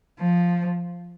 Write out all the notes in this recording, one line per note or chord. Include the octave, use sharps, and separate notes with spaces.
F3